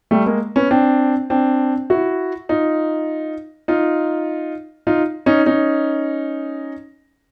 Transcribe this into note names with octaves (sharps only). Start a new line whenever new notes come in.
G3 A3
G#3 A#3
B3 C#4
C4 D4
C4 D4
E4 F#4
D#4 F4
D#4 F4
D#4 F4
C#4 D#4
C#4 D#4